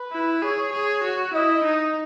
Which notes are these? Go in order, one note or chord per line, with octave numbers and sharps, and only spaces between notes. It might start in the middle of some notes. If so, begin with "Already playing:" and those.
Already playing: B4
E4
G#4 C#5
G#4
F#4
E4 D#5
D#4